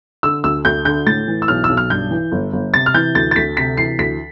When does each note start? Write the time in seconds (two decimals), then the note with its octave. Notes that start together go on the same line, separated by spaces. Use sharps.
0.23 D3 E6
0.44 D2 E6
0.65 D2 G6
0.85 D3 G6
1.06 A2 A6
1.28 E3
1.42 E6
1.48 B1 F6
1.64 E6
1.69 B1
1.77 F6
1.90 G2 G6
2.11 E3
2.32 G1
2.53 G1
2.74 C3 A6
2.86 F6
2.94 E3 G6
3.15 D2 A6
3.31 A6
3.36 D2 B6
3.57 C3 B6
3.77 E3 C7
3.99 D2 B6